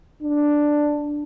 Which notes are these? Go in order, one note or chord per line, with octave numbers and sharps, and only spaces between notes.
D4